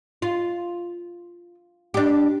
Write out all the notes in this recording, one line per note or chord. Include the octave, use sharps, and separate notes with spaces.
F4
D4 G4